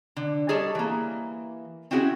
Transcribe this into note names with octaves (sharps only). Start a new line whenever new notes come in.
D3
G3 G#4 A4 C#5 D#5 A5
E3 A#3
C4 C#4 E4 F#4 G#4